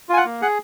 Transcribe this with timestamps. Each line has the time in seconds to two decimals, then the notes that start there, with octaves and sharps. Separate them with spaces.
0.09 F4 G#5
0.17 F#5
0.25 A#3
0.42 G#4 F#5